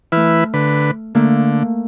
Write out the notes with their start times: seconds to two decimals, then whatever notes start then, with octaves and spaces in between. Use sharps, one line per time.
0.12 E3 A3 E4 B4 F6
0.54 D3 B4
1.15 D3 A3 A#3